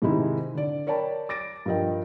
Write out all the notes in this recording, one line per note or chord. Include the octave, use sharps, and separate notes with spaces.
G#2 C3 D#3 G#3 D#4 E4
D3 D5
A#4 C#5 D5 G5 A5 B5
D6 A6 A#6 D7
G2 F3 A#4 D#5 G5